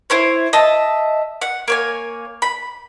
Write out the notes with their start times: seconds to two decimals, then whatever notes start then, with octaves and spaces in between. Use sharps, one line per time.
0.10 E4 C5 C#5
0.53 D#5 E5 A5
1.42 F#5
1.68 A#3 C#5 G#5
2.42 B5